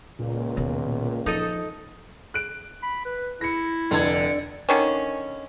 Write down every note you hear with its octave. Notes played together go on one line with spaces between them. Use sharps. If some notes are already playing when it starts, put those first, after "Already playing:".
C#2 A#2
D#2 B2
F3 D#4 A4 D#5
F#6 D7
B5
B4
E4 A#6 C#7
F1 D3 G#6
D3 D#3 C#4